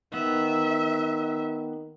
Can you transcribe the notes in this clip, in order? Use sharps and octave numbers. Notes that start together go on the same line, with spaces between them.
D#3 B3 E5